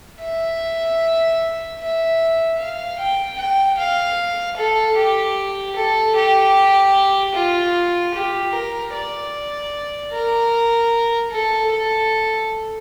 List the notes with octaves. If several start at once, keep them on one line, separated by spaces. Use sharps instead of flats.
E5
E5
F5
G5
G5
F5
A4
G4
A4
G4
F4
G4
A#4
D5
A#4
A4
A4